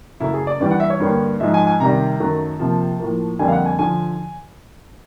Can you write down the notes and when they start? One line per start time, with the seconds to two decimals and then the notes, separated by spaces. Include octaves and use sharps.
0.20 F#2 C#3 F#3 A3 E4
0.34 G#4
0.47 D5
0.60 G2 E3 G3 D5
0.71 F#5
0.80 E5
0.90 C#5
1.00 G2 D3 G3 A#3
1.40 G#2 F3 G#3 E5
1.54 G#5
1.67 G#5
1.80 C3 D#3 G3 A#5
2.20 F#2 D#3 F#3 A3
2.59 C3 F3 A#3 A5
2.99 A2 F3 A#3
3.39 F2 D3 G3 A#3 G#5
3.48 F5
3.52 F#5
3.66 G#5
3.79 D3 F3 G#5